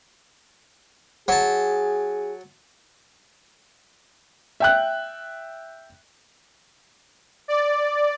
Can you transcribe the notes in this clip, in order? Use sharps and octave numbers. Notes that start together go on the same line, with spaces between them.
F#3 G#4 A5
E5 G5 F#6
D5